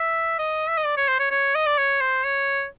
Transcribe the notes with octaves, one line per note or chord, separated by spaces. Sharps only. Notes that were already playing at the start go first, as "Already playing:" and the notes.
Already playing: E5
D#5
E5
D#5
D5
C#5
C5
C#5
C#5
D#5
D5
C#5
C5
C#5